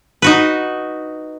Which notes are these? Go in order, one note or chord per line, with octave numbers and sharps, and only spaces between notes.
D#4 F#4 B4